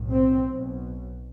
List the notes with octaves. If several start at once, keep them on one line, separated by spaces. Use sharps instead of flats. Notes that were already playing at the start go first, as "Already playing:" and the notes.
Already playing: B1 A2
C4
B1 B2